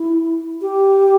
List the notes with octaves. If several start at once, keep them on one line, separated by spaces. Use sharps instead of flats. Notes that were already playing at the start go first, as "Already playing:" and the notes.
Already playing: E4
G4